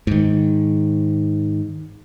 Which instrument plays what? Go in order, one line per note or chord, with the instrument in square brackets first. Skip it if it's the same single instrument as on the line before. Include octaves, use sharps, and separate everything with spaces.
[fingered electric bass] G#2 D#3